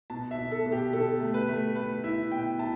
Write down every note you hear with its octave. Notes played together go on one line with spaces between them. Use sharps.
B2 A5
E5
B2
A4
B2
G4
B2 A4
A3
B4
A3
A3 B4
E4 E5
B2 G5
E4 A5